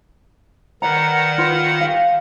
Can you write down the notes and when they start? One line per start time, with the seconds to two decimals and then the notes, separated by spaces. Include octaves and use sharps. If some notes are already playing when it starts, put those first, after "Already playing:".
0.82 D#3 B4 D5 F#5 A#5
1.38 F4 B4
1.81 G4 F5